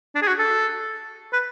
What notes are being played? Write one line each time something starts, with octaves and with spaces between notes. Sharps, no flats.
D4
G#4
F#4
A4
B4